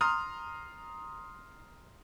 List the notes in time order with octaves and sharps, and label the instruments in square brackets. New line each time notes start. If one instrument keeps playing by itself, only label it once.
[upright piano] A#5 C6 D#6 F6